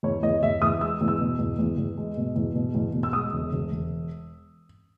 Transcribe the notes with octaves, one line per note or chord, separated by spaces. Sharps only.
E2 C#5
E2 D#5
E2 E5
E2 D#6
G#3 E6
E2
E6
B2
E2
E2
E2
G#3
B2
E2
B2
E2
B2
E6
G#3 D#6
E1
E1
E1